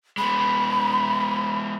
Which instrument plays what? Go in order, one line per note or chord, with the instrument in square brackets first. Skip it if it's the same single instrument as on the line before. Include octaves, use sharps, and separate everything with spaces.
[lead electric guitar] G#3 B3 [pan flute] B5